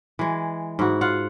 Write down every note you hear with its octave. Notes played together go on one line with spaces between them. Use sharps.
E3 G#3
G#2 E4 F#4
F4 F5 F#5